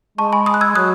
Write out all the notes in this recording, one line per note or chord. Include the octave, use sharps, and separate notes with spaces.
G#3 A5 C#6
G#5 B5
B5 D#6
F#6
E6 G#6
F#3 D#6 F#6